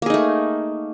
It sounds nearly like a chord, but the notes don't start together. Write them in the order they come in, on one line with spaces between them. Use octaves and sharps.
A#3 G#4 D#4 A3